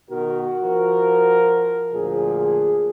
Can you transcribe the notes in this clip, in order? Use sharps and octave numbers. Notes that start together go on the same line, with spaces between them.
B2 D#3 F#4 A#4
F3 A#4
D2 A#2 F3 G#4